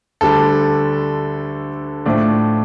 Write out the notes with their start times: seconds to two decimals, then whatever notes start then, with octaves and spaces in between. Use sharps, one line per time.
0.21 D2 D3 G3 A4
2.06 A2 F3 A3 D4